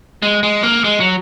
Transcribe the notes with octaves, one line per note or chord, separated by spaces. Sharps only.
G#3
G#3
A#3
G#3
F#3